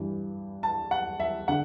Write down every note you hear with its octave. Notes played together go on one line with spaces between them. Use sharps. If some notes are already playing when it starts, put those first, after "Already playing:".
Already playing: G2 E3
A5
F#5
E5
D3 F#5